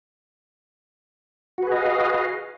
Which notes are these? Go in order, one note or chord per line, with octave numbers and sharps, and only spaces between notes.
F#4 G#4 B4 D#5 F5